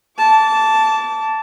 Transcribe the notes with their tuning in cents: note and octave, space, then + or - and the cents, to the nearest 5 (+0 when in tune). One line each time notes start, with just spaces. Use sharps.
A5 +0 D6 -30